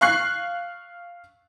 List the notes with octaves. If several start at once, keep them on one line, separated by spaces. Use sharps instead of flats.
F5 C#6 F#6 C7